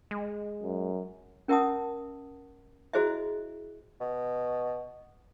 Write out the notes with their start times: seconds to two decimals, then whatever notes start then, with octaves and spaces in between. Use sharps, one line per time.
0.11 G#3
0.63 F#2
1.48 C#4 A#4 E5 F#5 A5 D#6
2.93 E4 F#4 G#4 C5 D#5 E5
4.01 B2